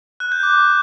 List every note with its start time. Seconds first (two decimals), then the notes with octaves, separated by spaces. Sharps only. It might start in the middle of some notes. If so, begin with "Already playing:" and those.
0.20 F#6
0.32 G6
0.43 D6